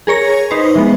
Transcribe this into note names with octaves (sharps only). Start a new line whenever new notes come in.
G#4 A#4 C#5 A#6
D#4 B4 C5
E3 G#3 B3